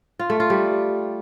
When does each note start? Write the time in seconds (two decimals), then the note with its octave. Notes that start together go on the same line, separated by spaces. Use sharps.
0.19 F4
0.30 A3
0.40 F4
0.50 G3